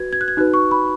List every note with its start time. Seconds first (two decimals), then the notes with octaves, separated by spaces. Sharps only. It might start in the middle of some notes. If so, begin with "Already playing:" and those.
Already playing: F#4 B4 G#6
0.13 G#6
0.21 F#6
0.28 G#6
0.37 D#4 F#4 B4 F#6
0.54 C#6
0.71 B5